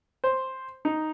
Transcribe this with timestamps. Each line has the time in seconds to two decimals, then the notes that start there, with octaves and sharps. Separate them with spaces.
0.24 C5
0.85 D#4